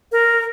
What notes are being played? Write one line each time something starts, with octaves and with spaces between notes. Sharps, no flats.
A#4